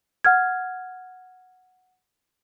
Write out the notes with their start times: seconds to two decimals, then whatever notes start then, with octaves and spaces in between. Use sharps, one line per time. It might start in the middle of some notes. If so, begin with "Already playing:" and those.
0.25 F#5 F6 G#6